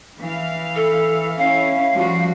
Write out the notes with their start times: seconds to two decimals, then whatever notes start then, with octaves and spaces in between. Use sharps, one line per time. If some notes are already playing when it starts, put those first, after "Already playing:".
0.16 E3 F5
0.76 A4
1.38 C#4 E4 F5
1.94 F3 G3 F#4